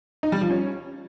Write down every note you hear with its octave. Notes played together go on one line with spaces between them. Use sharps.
D#4
G3
F3
C#4